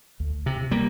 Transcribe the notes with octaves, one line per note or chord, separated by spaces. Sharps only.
D2
C3
G3 A#3